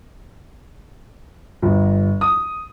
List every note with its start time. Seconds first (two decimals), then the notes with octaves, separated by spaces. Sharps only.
1.62 G1
2.21 D#6